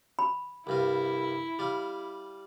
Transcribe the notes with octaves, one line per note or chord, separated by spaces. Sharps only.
B5
C2 G2 E4 F4
G3 F4